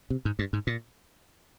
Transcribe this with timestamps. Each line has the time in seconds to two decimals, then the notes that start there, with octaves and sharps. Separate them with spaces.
0.10 C3
0.25 G#2
0.39 G2
0.53 G#2
0.67 A#2